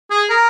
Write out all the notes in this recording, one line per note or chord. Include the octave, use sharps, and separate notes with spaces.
G#4
A#4